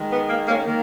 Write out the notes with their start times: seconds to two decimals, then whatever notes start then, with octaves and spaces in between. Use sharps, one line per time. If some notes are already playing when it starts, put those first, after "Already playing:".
Already playing: D#3 G#3
0.11 B3
0.30 A#3
0.48 A#3 C#4
0.66 D#3 A#3